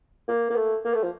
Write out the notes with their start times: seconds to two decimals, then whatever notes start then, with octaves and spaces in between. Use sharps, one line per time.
0.28 A#3
0.50 A#3
0.56 A3
0.85 A#3
0.94 A3
1.04 F3